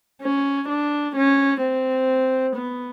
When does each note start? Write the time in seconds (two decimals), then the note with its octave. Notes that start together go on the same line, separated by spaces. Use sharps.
0.22 C#4
0.69 D4
1.16 C#4
1.62 C4
2.56 B3